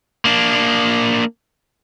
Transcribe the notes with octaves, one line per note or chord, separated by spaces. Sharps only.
A#3 D4